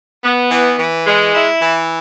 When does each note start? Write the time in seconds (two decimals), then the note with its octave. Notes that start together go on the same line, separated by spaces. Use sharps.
0.24 B3
0.51 E3
0.78 E3
1.06 G#3
1.35 E4
1.62 E3